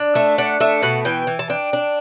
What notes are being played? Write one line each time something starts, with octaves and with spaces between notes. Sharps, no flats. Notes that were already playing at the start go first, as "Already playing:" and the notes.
Already playing: D4
A3 E5
D4 F#5
A3 E5
B2 F#5
E3 G5
E3
A5
D4 G5
D4